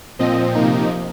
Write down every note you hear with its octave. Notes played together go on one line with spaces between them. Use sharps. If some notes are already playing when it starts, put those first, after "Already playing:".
A#2 F3 C4 D#5
C3 F3 A#3 D#4